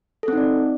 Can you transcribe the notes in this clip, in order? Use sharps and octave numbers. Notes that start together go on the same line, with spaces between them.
C4 D#4 A4 D5